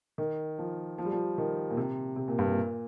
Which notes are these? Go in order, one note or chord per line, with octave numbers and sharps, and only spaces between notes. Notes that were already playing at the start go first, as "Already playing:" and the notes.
D#3
F3
F3
G3
F3
D#3
A#2
C3
C3
A#2
G2
A#2